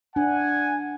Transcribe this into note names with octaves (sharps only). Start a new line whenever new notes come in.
D4 F#5 G#5